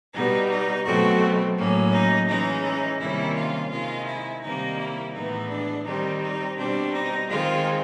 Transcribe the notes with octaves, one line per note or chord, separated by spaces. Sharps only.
B2 G3 B3 D#4
D#4
B2 F#3 A3 C4 F#4
A2 F#3 A#3 C#4
D#4
E3 G#3 C#4 D#4
D#4
C3 D#3 G3 A#3 C#4 E4
F4
C3 D#3 G#3 F4
E4
C3 D#3 G3 A#3 D#4
E4
A2 E3 G#3 B3 D#4
D4
D#3 G3 C4 D#4
D#4
B2 G3 C4 D4
D#4
D#3 G#3 C4 F4